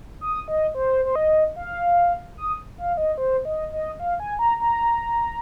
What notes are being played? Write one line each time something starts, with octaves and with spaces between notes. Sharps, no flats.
D#6
D#5
C5
C5
D#5
F5
D#6
F5
D#5
C5
D#5
D#5
F5
G#5
A#5
A#5